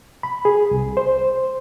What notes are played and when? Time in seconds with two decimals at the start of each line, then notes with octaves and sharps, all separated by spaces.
0.23 B5
0.45 G#4
0.71 C2
0.97 C5